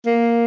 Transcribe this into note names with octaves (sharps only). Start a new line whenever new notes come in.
A#3